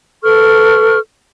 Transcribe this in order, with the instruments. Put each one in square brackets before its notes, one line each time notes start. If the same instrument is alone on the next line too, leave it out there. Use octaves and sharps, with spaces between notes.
[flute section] A4 B4 C#6 F6